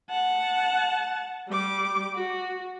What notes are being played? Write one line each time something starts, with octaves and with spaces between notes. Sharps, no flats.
F#5 A5
G3 D6
F#4